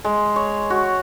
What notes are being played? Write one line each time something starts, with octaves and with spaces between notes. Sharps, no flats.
G#3
C#5
F#4